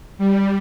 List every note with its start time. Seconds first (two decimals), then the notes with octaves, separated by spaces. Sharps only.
0.18 G3